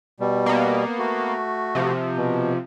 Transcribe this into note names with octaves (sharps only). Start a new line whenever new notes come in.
B2 G3
A#3 B3
A3 F#4
C3 F3
B2